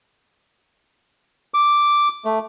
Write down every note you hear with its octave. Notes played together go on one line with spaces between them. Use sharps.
D6
A3